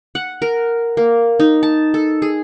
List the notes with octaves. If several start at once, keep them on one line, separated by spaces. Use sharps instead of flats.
F#5
A#4
A#3
D#4
A5
A4
G#4